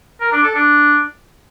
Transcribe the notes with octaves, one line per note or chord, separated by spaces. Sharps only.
A#4
D4
A4
D4